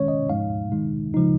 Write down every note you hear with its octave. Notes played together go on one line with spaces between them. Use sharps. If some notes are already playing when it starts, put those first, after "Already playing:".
Already playing: D#3 G#3 C#4 C#5
D#5
G#2 F3 G#3 D#4 F5
D#3 G#3 D#4
C#3 F3 G#3 D#4